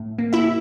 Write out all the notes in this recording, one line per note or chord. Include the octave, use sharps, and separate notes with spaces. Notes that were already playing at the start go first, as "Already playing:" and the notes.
Already playing: A2
A#3
E4 E5